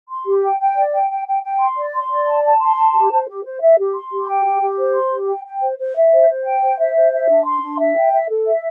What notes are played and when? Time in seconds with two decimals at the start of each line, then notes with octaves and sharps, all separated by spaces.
0.09 C6
0.26 G4
0.43 G5
0.58 G5
0.76 D5
0.92 G5
1.09 G5
1.26 G5
1.42 G5
1.59 C6
1.76 D5
1.94 C6
2.10 D5
2.27 A5
2.44 A5
2.60 C6
2.77 A5
2.94 G4
3.11 C5
3.27 G4
3.44 C5
3.60 E5
3.78 G4
3.94 C6
4.11 G4
4.28 G5
4.45 G4
4.62 G4
4.78 C5
4.94 C6
5.11 G4
5.27 G5
5.45 G5
5.61 C5
5.78 C5
5.95 E5
6.12 C5
6.28 C5
6.45 G5
6.61 C5
6.78 E5
6.96 C5
7.12 E5
7.29 D4
7.45 C6
7.62 D4
7.79 E5
7.97 G5
8.12 E5
8.29 A4
8.46 E5